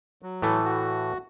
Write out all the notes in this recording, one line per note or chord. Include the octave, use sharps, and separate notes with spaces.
F#3
A2 E3 A3
F#4